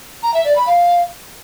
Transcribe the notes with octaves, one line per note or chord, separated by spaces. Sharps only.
A#5
E5
D5
B5
F5